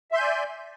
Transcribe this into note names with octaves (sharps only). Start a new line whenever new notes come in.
D5 E5 G#5 C6 G6